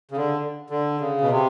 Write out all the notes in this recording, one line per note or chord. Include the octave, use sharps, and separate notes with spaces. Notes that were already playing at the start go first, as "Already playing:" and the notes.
C#3
D3
D3
C#3
B2
C3